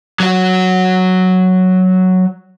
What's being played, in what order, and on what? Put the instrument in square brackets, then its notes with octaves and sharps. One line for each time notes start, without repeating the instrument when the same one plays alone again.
[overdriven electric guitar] F#3 F#4